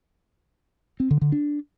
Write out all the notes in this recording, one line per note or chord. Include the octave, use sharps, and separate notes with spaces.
C4
D3
D3
D4